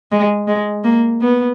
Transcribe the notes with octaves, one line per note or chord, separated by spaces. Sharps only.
G#3
G#3
A#3
B3